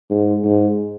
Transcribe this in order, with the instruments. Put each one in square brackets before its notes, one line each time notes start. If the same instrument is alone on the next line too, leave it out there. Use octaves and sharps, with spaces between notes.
[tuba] G#2
G#2